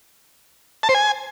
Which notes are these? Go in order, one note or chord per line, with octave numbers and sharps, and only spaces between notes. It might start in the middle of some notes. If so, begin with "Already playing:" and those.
A5
C5
G#5